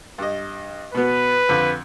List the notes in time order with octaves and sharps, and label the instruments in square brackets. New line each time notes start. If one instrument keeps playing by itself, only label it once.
[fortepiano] G2 D#5
[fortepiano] B2 B3 [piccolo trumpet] B4
[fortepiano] F2 D3